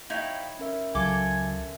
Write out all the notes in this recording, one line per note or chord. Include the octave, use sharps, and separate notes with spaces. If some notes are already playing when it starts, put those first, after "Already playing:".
D#4 E4 C#5 F5 G5
C#4 A#4 E5
C#2 F#3 F4 A4 G#5 D6